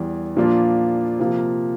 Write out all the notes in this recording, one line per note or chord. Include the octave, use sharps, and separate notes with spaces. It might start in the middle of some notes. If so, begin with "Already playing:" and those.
Already playing: E2 E3 G3
A#2 F3 A#3 D4 F4
C3 F3 A#3 F4